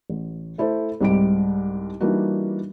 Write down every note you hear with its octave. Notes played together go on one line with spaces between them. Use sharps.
A1
A3 E4 A4 C5
C2 G#2 G3 G4 D7
E3 G3 A#3 D4 D#4 F#4